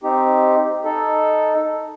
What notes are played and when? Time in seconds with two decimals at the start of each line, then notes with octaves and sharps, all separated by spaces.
0.03 C4 D#4 G4
0.85 D#4 A4